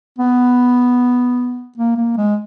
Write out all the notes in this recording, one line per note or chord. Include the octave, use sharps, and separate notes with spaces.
B3
A#3
A#3
G#3